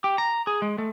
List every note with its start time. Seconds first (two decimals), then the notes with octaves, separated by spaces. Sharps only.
0.04 G4
0.18 A#5
0.47 G#4
0.62 G#3
0.78 A3